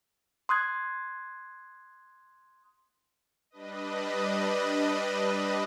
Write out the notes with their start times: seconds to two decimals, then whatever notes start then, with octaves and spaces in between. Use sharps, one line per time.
0.49 C6 D#6 F#6 G#6
3.50 G3 D4 B4 D#5